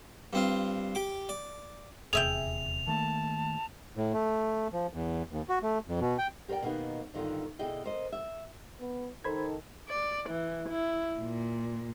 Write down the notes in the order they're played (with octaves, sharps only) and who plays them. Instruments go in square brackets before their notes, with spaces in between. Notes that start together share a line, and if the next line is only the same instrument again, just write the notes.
[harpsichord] G2 C4 F4
G4 D6
D5
[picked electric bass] D#1 E2 C3 [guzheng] G#4 E5 G5 [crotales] F7
[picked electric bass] D#3 A3 A#3 [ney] A5
[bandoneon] A2
A3
F3
E2
D#2
F#4
A3
F2
B2
G5
[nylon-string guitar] G4 A#4 C5 D5 G5
B2 D#3 A#3 B3 D#4 B4
G2 D3 D#3 B3 F4
B2 D3 E4 G#4 D#5 G5
A#4 C5 D#5
E5
[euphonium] B3
[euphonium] D#3 [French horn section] D#4 A4 [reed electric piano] C5 B5 G#6
[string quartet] D5
E3
E4
A#2